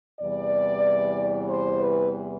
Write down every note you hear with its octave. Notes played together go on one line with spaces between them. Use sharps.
E2 C3 E3 G3 D5
C5
B4